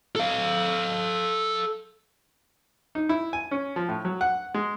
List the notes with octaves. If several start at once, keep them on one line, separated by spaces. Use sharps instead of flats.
A4 F5
D#4
E4
G#5
C#4
F3
A2
F#3
F#5
G#3